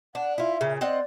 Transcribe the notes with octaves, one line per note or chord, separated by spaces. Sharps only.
D4 F#5
E4 F4 E5
A#2 C#3
C4 D5 D#5 F#5